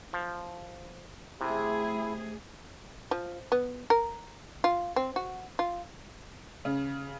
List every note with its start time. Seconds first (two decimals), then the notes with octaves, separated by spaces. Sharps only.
0.13 F3
1.41 C3 A3 E4 G#4
3.11 F3
3.52 B3
3.90 A#4
4.64 F4
4.96 C4
5.16 F#4
5.59 F4
6.65 C#3